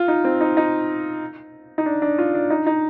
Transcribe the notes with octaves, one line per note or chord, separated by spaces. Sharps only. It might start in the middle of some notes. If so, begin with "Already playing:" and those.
Already playing: F4
D#4
C4
D#4
D#4
D#4
D4
D4
F4
D4
D#4
D#4